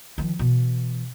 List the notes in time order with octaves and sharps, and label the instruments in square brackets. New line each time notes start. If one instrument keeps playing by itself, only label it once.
[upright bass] D#3 F3
B2 E3